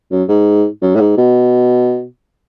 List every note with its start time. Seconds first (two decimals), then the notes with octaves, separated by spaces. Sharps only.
0.11 F#2
0.29 G#2
0.82 F#2
0.96 A2
1.00 G#2
1.17 B2